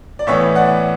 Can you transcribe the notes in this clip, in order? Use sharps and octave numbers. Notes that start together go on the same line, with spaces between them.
D5
A2 E3 B3 C#5 E5
D5 F#5